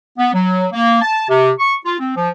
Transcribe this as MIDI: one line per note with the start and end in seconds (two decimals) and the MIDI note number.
0.18 0.33 59
0.34 0.67 54
0.72 1.00 58
1.02 1.26 81
1.29 1.51 48
1.59 1.75 85
1.85 1.96 65
2.00 2.16 60
2.17 2.30 53